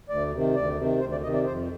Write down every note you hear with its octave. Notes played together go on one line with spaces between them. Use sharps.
D2 D5
C3 D#3
D2 D5
C3 D#3
D2 C5
D5
C3 D#3 D#5
D5
F2 C5